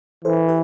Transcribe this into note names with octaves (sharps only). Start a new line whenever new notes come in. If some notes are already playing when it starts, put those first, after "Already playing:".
E3 A4 C5
G4 B4